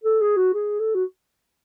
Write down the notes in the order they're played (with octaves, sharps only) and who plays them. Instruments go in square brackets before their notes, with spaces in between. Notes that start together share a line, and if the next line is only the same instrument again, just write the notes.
[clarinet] A4
G#4
F#4
G#4
A4
F#4